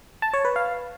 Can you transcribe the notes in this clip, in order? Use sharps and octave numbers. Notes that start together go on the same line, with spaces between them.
A5
C#5
B4
F5